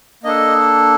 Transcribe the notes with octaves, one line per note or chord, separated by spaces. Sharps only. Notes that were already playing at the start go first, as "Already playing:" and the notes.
A#3 D4 A4 D#5